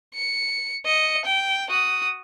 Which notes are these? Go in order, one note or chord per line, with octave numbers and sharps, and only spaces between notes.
C#7
D#5 C#7
G5
F#4 D#6